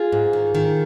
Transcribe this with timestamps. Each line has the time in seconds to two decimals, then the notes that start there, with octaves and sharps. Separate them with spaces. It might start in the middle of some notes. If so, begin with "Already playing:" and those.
Already playing: F4 G#4
0.12 G#2
0.33 D#3
0.55 D#3